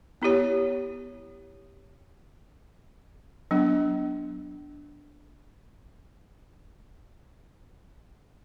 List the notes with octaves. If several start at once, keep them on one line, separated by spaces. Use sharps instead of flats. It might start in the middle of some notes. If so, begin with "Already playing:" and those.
B3 E4 G4 C#5
F#3 B3 D4